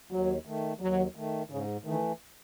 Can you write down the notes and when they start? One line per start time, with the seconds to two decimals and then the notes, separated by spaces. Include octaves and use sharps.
0.11 D#2 F#3
0.45 D#3 A3
0.80 D#2 F#3
1.15 D#3 A3
1.50 G#2 C#3
1.84 D#3 E3 A3